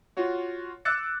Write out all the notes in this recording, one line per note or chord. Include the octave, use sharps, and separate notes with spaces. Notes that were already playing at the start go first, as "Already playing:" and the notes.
F4 F#4 C#5
D6 E6 F#6 A6 C#7